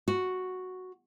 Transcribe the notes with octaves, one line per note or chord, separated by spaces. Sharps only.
F#4